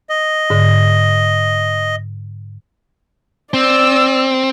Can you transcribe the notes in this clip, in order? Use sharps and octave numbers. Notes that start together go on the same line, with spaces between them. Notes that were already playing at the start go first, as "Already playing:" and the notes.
D#5
G#2 D3
C4 D5 E6